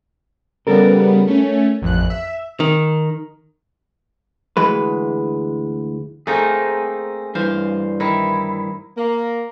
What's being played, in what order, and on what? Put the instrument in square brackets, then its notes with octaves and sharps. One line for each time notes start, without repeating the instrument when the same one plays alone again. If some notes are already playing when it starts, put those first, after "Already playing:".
[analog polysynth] C#3 G3 B3 [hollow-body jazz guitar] A4 A#4
[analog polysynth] A3 C#4
A1 F2 F#6
E5
[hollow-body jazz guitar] D#3
D2 E3 G#3 B4
[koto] A3 A#3 D#4 [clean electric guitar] C4 G#4
[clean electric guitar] G2 E3 [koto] C5 F5
[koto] D#3 E4
[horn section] A#3